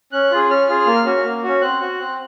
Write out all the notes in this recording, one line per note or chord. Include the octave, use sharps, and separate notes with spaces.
C#4 F#6
F4 G#4
C#4 F6
F4 G#4
A#3
C#4 F#4
A#3
C#4 F#4
C4 F#6
F#4
C4